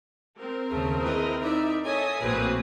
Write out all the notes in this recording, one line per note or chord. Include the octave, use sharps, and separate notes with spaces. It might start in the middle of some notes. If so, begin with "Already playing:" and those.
C4 A#4
D#2 C#3 A3 G#4
E4 B4 D#5
D#4 D5 E5
A4 C#5 D#5 E5 G#5 D#6
A#1 A2 A#3 C4 F#4 B4